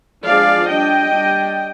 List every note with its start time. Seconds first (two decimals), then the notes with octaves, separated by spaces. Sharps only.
0.25 F3 G#3 D4 D5 F5
0.68 G3 D4 D#5 G5
1.11 G3 D4